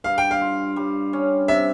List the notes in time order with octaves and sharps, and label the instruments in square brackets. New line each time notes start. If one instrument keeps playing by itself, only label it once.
[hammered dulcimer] G2 [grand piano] F5
[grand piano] G5
F5
[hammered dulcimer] F4
G3
C#4
[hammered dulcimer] C3 [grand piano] E5